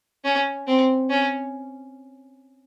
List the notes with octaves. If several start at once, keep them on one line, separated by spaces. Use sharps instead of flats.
C#4
C4
C#4